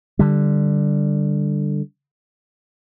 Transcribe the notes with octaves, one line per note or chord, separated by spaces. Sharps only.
D3 G3